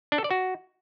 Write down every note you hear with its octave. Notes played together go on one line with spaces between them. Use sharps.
D4
A4
D5
F#4